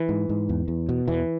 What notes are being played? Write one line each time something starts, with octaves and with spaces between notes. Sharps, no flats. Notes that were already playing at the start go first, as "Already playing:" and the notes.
Already playing: E3
G#2
G#2
E2
E2
B2
E2 E3